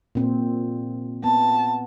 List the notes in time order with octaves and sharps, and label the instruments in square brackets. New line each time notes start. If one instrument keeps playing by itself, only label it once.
[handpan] A#2 C4
[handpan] B3 [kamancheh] A5